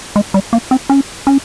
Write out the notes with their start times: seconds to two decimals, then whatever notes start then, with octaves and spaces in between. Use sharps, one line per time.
0.16 G#3
0.34 G3
0.53 A#3
0.71 C4
0.90 C#4
1.27 C#4